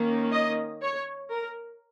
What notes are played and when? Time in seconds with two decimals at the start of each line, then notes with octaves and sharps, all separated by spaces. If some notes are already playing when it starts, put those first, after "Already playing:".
Already playing: D#3 A#3 C#4
0.32 D#5
0.82 C#5
1.30 A#4